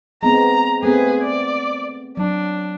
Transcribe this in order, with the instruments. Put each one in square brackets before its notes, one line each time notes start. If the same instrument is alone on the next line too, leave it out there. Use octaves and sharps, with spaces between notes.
[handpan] G#3 B3 C4 [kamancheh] A#5
[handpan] A3 B3 C4 [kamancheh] G#4 B4
[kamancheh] D5
[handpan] F#3 [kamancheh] D4